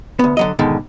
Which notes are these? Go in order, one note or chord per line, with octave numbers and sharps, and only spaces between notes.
D2 B3
D3 F#3 D#5
G#2 B2 D3 D#3 G#3